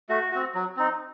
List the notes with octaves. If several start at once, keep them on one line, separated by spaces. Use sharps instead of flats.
A3 F#4
C4 F#4
F#3
C4 D#4